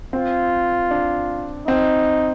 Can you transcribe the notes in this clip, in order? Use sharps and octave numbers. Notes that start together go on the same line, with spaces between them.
C4 F4
D4
C4 D#4